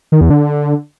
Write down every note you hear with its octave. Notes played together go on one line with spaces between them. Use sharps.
D#3
E2
D3